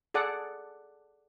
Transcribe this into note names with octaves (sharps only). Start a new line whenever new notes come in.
G#4 A4 D5 F#5